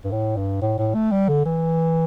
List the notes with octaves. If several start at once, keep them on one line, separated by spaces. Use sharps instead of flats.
G2
A2
G2
A2
A2
A3
G3
D3
E3